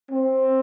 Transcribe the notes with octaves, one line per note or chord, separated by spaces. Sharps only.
C4